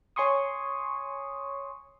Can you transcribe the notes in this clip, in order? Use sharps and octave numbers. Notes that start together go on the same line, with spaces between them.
C#5 G#5 C6 C#6 D#6